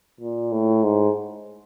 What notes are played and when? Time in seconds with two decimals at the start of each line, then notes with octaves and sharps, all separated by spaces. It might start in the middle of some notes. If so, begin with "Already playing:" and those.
0.20 A#2
0.52 A2
0.84 G#2